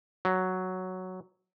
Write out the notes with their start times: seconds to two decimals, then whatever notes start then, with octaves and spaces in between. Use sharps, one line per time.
0.25 F#3